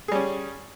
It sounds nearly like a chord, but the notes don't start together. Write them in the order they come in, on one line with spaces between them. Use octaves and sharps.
G#4 G3 C#4